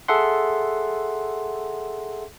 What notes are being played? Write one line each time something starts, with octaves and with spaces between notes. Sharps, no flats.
G#4 A4 E5 F#5 C6